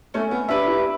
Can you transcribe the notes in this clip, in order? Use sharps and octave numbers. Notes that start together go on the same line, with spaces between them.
A3 C#4
B3
D4 G4 B4 E5
E4